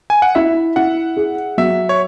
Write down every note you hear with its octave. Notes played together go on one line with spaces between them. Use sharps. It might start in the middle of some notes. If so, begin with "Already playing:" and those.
G#5
F#5
E4 E5
E4 F#5
G#4
F#3 E5
C#5